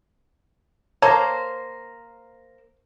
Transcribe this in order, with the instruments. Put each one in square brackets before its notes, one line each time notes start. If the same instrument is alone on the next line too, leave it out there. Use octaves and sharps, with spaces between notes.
[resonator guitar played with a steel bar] A#3 C5 [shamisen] A4 [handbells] C#5 A#5